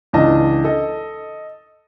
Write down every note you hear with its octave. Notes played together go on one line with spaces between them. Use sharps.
C#2 E3 D4 D#5 A5
A4 D#5